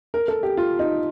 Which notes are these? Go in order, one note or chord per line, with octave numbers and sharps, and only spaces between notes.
A#4
A4
G4
F4
D#4